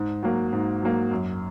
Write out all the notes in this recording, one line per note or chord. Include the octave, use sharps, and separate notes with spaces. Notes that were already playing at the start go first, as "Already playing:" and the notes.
Already playing: G#2
F#3 A#3
G#2
F#3 A#3
F#2